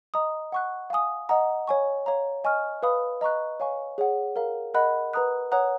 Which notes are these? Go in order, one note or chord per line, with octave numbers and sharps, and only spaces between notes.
D#5 A#5 D#6
F#5 C#6 F#6
F5 G#5 D#6
D#5 F#5 A#5 D#6
C#5 G#5 C#6
C#5 F5 A#5
D#5 G#5 C#6 F6
B4 F5 B5 D#6
D#5 A#5 C#6 F#6
C#5 F5 G#5 C#6
G#4 C#5 F#5
A#4 F5 A#5
A#4 D#5 F#5 B5 F#6
B4 F#5 A#5 D#6 F#6
C#5 F#5 A#5 D#6 F#6